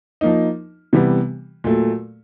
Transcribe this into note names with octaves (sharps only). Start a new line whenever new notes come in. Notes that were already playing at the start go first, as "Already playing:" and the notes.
F3 A#3 D#4
C3 E3 G3 B3
A#2 F#3 A3